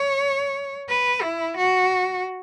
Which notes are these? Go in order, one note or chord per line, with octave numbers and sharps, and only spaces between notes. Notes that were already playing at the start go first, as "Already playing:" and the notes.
Already playing: C#5
B4
E4
F#4